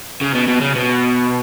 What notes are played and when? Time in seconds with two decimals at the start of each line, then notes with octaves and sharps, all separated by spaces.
0.21 C#3
0.35 B2
0.48 B2
0.61 C#3
0.75 B2